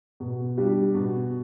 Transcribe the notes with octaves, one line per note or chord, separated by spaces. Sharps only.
B2
G3 D4 G4
B2